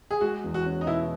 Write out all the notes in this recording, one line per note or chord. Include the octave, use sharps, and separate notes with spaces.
G#4
G#3 F#4
E2
F#4
C#4
D#4
B2 E4